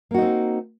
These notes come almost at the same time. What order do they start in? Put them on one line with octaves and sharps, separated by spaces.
A#3 F#4 D#4 C4